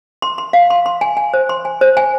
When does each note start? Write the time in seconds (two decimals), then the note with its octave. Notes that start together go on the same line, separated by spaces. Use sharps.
0.22 C6
0.38 C6
0.53 F5
0.70 C6
0.86 C6
1.01 G#5
1.17 G#5
1.34 C5
1.49 C6
1.65 G#5
1.81 C5
1.97 G#5